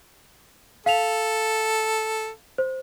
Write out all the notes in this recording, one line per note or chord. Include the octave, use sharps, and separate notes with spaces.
A4 F5 F7
C5